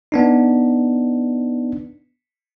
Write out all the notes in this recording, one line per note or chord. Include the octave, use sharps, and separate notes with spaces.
B3 D4 D#4